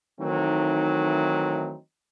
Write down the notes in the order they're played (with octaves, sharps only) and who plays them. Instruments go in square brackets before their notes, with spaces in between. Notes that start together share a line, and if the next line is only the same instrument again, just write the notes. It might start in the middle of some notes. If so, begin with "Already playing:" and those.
[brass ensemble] D#3 E3 F#3 A3 C4 D#4